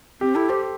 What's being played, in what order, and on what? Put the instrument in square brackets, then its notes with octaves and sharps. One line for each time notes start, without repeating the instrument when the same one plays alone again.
[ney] C4 [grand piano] G4
[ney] E4 [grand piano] A4
[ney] G4 [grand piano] C5